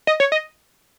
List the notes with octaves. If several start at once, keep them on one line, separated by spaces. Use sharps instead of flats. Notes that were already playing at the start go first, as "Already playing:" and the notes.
D#5
C#5
D#5